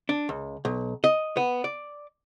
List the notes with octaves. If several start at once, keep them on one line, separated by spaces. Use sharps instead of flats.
D4
C#2
B1
D#5
B3
D5